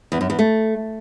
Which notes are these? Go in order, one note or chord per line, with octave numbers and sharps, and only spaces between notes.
E2
F#2
E2
A3